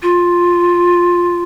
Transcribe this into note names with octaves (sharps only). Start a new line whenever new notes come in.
F4